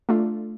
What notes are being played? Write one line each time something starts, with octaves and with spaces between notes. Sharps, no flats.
A3 D4 F4